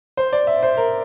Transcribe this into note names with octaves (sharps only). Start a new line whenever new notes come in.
C5
D5
E5
C5
A#4